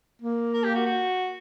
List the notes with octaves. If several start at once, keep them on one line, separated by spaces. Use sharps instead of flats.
A#3
A#4
G4
F#4
F#4